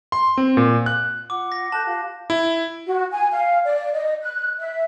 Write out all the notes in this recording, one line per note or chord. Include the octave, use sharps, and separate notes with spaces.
C6
C4
A#2
F#6
F4 F#5 D6
A#6
A4 A5 F#6 G6
F4 G4 F5
E4
F#4
G#5
F5
D5
D#5
F#6
E5